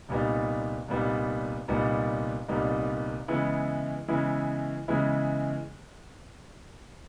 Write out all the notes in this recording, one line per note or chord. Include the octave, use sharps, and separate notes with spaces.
C2 A#2 G3 B3 D#4
C2 A#2 G3 B3 D#4
C2 A#2 G3 B3 D#4
C2 A#2 G3 B3 D#4
C#3 E3 G#3 B3 E4
C#3 E3 G#3 B3 E4
C#3 E3 G#3 B3 E4